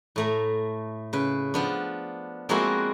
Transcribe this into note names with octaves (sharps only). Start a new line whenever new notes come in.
A2 A3 A#5
C#3 B4
F3 B3 D4
F3 G#3 A#3 C4 E4 F#4